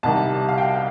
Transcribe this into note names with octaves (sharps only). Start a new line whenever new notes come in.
C2 C3 D#3 G3 A5
F5
G5